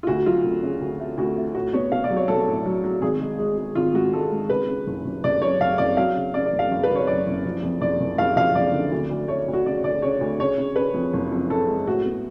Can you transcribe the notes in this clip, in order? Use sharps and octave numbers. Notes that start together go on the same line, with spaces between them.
F4
D2 F#4
F#3 F4
D2
C#3
D2
A3
D2 F#4
A3
A2 F#4
B3 C#5
B3 F5
D5
F#3
C#5
B1 A4
A2
F#3
F#3
G#1 G#4
G#3
G#3
G#3
G#1 F4
G#2 F#4
G#3 A4
G#2
C#3 B4
C#3
F#1
F#1
F#1 D5
F#2 C#5
F#2 F5
F#1 D5
F#3 F5
C#3
C#3 D5
D5
F#1
F5
F#1
B4
F#3
C#5
F#2 D5
F#1
F3
F2
F#1 D5
F#1
F#1 F5
F3 F5
F#1 D5
D3
D2
D2
A3 C#5
D2
F#4
C#3 D5
D2 D5
C#3 C#5
D2
C#3 C#5
C#3
C#3 B4
F2
F#1
F2
C#3 A4
G#3
A2 F#4
B3